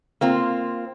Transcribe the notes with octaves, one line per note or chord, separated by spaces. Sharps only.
A#3 C4 F4